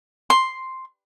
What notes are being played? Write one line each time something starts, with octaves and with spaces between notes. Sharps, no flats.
C6